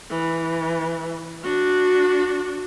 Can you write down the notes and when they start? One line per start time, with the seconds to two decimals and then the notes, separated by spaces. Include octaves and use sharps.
0.10 E3
1.43 D4 F#4